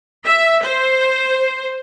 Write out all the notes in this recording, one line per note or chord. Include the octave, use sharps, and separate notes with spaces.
E5
C5